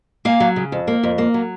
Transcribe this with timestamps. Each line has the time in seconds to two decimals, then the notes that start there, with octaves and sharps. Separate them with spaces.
0.25 A#3 F5 G#5
0.40 F#3
0.56 C#3
0.72 F2
0.88 A#3
1.03 F2
1.18 A#3
1.34 F#3